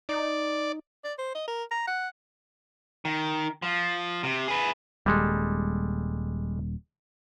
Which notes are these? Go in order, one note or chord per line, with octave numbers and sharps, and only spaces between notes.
D#4 D5
D5
C5
D#5
A#4
A#5
F#5
D#3
F3
C3
G#4 B4
D#1 G3 G#3 A4